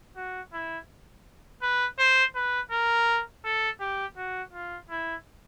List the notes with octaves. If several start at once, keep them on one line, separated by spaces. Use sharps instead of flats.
F#4
E4
B4
C5
B4
A#4
A4
G4
F#4
F4
E4